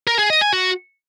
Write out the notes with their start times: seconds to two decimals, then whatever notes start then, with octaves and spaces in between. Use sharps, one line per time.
0.07 A#4
0.19 G#4
0.30 D#5
0.41 G#5
0.53 F#4